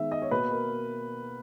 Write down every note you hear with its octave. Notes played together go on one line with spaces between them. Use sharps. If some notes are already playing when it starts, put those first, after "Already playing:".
Already playing: D#3 G#3 B3 E5
D#5
C#5
B2 A#3 B4
A#4